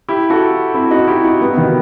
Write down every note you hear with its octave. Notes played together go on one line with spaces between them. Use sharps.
E4 G4
F#4 A4
C4 E4
D#4 F#4
E4 G4
D#4 F#4
G3 B3
B2 D#3